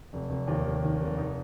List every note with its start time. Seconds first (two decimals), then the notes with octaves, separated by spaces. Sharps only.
0.13 F1
0.30 F1
0.48 D#2
0.65 D#3
0.83 D#3
1.00 F1
1.18 D#4